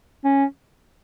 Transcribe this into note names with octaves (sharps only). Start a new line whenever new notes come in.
C#4